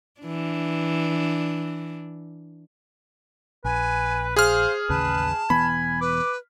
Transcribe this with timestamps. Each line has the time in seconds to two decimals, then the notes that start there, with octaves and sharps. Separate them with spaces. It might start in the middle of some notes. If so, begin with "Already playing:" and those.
0.21 E3 D4
3.65 A#1 B4 G#5
4.36 G#4 C5 F5 F6
4.90 A1 D#2 C#3 B4 A5
5.50 E1 E3 B3 G#5 B5
6.01 B4 D6